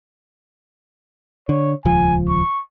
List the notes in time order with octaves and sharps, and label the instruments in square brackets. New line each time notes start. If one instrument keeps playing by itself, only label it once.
[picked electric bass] D3 [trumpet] C#5
[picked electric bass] D#1 C#2 F3 [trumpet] G#5
[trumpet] C#6